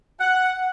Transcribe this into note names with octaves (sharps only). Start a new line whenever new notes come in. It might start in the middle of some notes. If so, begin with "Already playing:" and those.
F#5